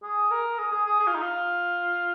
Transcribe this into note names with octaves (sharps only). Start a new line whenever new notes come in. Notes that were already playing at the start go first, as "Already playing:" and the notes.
G#4
A#4
G#4
G#4
G#4
G#4
F4
D#4
F4